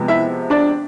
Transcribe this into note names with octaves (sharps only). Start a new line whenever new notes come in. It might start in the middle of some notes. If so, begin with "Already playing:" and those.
Already playing: C3 F3 G#3 B3
E4 E5
D4 D5